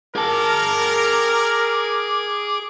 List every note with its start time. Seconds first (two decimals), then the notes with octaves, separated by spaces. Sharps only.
0.16 G#4 A#4 A5 D6